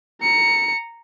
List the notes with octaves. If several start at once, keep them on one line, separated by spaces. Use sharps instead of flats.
A#5 C#7